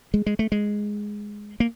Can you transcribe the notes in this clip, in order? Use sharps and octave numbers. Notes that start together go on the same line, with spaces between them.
G#3
G#3
A3
G#3
A#3